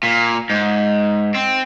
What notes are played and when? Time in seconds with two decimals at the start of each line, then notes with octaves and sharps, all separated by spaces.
0.03 A#2
0.50 G#2
1.35 C4